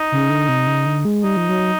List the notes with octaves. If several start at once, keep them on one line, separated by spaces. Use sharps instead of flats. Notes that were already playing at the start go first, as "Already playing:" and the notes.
Already playing: D#4
C#3
D3
C3
C#3
D3
G#3
G3 D#4
F3
F#3